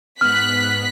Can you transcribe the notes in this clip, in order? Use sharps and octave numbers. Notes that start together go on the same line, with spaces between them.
G#2 B3 F6 F#6 B6